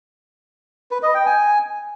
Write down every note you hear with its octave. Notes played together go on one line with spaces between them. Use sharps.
B4
D#5
G5
G#5